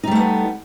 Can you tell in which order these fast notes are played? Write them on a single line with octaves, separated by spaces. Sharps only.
D#4 G3 A3 B3